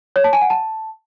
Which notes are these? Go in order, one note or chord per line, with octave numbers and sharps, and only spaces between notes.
C#5
A5
G#5
F#5
A5